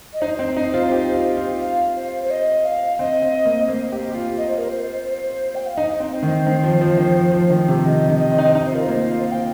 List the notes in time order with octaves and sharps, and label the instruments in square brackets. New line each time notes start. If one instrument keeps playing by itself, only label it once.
[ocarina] D#5
[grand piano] D#4 [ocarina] C5
[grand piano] C4
D#4
F4
G4
F4
F4
[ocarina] F5
C5
C5
D#5
F5
[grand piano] C4 [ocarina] D#5
[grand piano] C4
A#3
[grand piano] A#3 [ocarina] C5
[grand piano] G4
G4
F4
[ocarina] D#5
C5
A#4
C5
C5
G5
F5
[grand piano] D#4 [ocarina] D#5
[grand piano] C4
[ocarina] C5
[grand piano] D#3
D#3
F3
F3
D#3
F3
F3
D#3
C3
[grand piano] D#3 [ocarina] D#5
[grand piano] D#3
[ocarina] D#5
[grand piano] C4
D#4
C4
[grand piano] D#4 [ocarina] D#5
[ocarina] C5
[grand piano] F4
[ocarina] A#4
[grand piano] A#3 [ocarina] C5
[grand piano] F4
[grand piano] F4 [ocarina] F5
[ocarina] G5